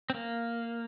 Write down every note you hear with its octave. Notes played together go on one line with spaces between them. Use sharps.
C4
A#3